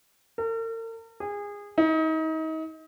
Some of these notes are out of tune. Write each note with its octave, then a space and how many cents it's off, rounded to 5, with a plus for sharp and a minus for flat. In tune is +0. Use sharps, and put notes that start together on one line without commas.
A#4 -45
G#4 -25
D#4 +35